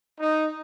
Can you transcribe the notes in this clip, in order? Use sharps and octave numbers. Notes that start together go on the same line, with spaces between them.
D#4